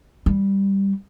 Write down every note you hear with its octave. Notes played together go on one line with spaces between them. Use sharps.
G3